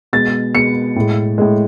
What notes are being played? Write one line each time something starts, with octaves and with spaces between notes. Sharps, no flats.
B2 G#3 A6
B2 G#3 C#7
A2 G#3
A2 G#3